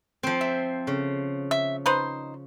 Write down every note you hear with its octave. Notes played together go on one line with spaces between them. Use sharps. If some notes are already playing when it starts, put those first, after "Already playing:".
F3 C4
E5
C#3
E5
D#4 B4 C5